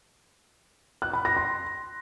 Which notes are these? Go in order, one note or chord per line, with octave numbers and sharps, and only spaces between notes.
F#6
B5
A#6
C6